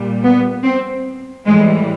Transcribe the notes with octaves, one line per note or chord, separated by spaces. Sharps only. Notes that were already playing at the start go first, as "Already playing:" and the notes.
Already playing: A#2 G3
B3
C4
A2 E3 G3 G#3